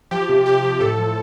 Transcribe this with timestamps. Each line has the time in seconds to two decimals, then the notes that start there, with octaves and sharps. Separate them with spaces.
0.11 F3 G4
0.29 C3
0.46 F3 G4
0.63 F3
0.81 A2 A4
0.98 F3